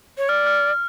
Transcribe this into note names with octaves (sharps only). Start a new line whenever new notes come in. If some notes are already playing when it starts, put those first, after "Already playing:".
C#5
D5 F6
F6